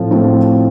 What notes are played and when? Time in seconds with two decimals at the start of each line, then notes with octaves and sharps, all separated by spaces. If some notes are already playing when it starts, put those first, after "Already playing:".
Already playing: A2 F3 C4 F4
0.11 A2 F3 A3 C4 F4